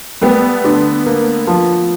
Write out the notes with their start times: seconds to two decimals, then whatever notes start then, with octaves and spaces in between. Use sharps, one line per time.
0.21 G3 A3 B3
0.64 D3
1.06 A#3
1.47 F3